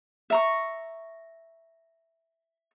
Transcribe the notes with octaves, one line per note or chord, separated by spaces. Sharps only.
E5 A#5 C#6